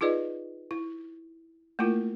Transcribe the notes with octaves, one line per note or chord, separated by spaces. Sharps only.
D#4 F4 G#4 B4 D5 D#5
E4
A3 A#3 E4 F4 A#4